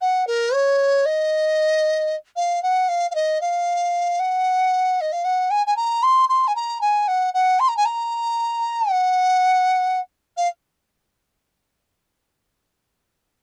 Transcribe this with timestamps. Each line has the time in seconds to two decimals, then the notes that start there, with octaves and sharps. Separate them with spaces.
0.01 F#5
0.27 A#4
0.54 C#5
1.05 D#5
2.36 F5
2.63 F#5
2.88 F5
3.11 F5
3.15 D#5
3.41 F5
4.19 F#5
5.01 D#5
5.12 F5
5.24 F#5
5.50 G#5
5.66 G#5
5.76 A#5
6.03 C6
6.29 C6
6.47 G#5
6.55 A#5
6.81 G#5
7.08 F#5
7.34 F#5
7.60 C6
7.68 A#5
7.77 G#5
7.85 A#5
8.90 F#5
10.37 F5